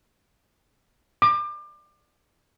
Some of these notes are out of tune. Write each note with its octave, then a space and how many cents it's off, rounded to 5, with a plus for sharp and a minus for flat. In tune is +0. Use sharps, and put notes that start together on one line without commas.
D6 +30